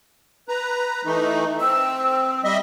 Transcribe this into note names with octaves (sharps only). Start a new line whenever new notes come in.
B4 A#5
E3 A3 D#4
C4 E6
G3 D#5 E5